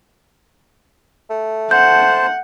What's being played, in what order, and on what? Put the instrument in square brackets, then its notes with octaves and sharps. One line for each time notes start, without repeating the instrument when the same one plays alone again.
[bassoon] A3
[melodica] C5 A5 [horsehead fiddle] F#5 [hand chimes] G6